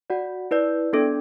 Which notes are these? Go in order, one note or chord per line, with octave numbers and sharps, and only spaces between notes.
F#4 D5 F#5
E4 B4 D5
B3 D4 A4 D5